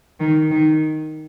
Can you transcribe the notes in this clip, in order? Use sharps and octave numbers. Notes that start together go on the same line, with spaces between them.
D#3
D#3